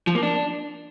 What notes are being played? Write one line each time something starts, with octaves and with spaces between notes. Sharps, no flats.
F3
A#3
D4